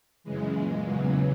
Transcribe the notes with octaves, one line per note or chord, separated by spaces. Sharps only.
F#2 C#3 E3 G#3
A#2 G#3
E2 C#3 E3 F#3